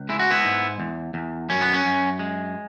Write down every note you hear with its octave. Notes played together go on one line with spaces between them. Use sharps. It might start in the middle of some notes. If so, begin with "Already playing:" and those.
Already playing: C#2
G#3 E4
F#4
B3 E4
G#2
E2
E2
F#2 C#4
B3
C#4
F#2
G#3